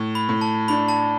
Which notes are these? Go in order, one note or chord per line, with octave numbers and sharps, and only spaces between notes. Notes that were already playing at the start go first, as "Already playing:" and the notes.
Already playing: A2
B5
A2
A5
D4 B5
A5